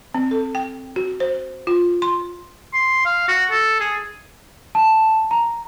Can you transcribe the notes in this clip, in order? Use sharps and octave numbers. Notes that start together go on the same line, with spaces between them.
C4
A4
G5
F#4
C5
F4
C6
C6
F5
F#4
A4
G#4
A5
A#5